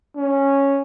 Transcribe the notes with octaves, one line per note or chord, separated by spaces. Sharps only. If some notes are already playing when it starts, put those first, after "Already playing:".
C#4